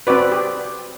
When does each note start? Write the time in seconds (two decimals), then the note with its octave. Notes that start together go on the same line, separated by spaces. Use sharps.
0.07 C4 F#4 B4 D5
0.32 G4